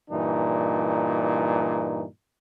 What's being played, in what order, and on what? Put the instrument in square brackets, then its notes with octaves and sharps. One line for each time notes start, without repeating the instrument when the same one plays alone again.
[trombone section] G2 A#2 E3 D#4